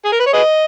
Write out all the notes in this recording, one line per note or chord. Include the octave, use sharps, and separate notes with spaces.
G#4
A#4
B4
C#5
G#4 B4 D#5